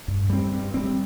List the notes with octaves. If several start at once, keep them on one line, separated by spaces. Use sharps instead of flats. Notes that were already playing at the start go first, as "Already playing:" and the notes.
G2
G3 C4
G2
G3 C4